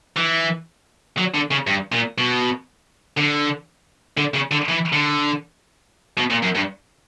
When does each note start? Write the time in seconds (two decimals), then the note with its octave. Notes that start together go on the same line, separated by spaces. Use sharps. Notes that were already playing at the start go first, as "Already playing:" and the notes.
0.17 E3
1.17 F#3
1.34 D3
1.51 C#3
1.67 G2
1.92 A#2
2.18 B2
3.18 D3
4.17 D3
4.34 C#3
4.51 D3
4.68 E3
4.92 D3
6.18 B2
6.31 A#2
6.43 F#2
6.55 G2